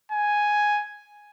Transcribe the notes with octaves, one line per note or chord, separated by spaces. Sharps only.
G#5